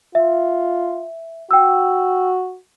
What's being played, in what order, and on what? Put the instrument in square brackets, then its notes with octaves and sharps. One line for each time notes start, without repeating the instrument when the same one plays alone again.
[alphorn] F4 [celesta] E5
[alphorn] F#4 [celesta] G5 E6